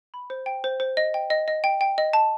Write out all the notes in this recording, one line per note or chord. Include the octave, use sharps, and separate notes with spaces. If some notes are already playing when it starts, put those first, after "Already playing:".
B5
C5
G5
C5
C5
D#5
G5
D#5
D#5
G5
G5
D#5
A5